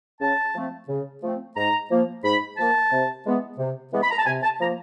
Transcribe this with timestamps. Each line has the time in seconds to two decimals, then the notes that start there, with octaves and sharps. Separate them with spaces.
0.21 C#3 A5
0.55 F3 A3 C4
0.89 C#3
1.23 F3 A3 C4
1.56 G#2 A#5
1.90 F3 A#3
2.24 G#2 B5
2.57 F3 A#3 A5
2.92 C3
3.26 E3 G#3 B3
3.58 C3
3.92 E3 G#3 B3
4.03 B5
4.11 A#5
4.19 A5
4.26 C3 G#5
4.43 A5
4.60 F3 A#3 A#5